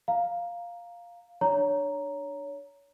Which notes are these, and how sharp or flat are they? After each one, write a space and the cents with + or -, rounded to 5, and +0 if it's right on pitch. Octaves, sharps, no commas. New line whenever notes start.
F5 +0 A#5 +0
D4 +20 C#5 +20 A#5 +0